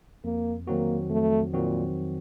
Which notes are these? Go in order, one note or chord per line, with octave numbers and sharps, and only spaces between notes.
F2 A#3
D#3 F#3 A#3 C4 F#4
F2 A3
A#2 D#3 F#3 C4 F#4